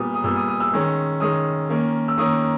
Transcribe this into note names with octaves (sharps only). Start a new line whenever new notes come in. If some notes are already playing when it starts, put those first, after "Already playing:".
Already playing: A#2 G3 B3 D#6
D#6
A#2 G3 B3 E6
D#6
D#6
E6
D#3 G#3 C#4
D#3 G#3 C#4 D#6
D#3 A#3 C#4
E6
D#3 A#3 C#4 D#6